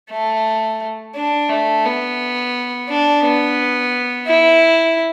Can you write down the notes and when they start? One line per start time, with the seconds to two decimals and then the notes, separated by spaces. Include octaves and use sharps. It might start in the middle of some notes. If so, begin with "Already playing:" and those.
0.10 A3
1.15 D4
1.49 A3
1.85 B3
2.88 D4
3.23 B3
4.27 E4